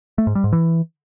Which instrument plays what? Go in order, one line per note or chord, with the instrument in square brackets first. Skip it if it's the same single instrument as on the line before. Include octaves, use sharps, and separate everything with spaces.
[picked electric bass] A3
G#2
G3
G#2
E3